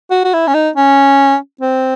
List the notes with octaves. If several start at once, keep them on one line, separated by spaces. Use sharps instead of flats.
F#4
F#4
E4
C#4
D#4
C#4
C4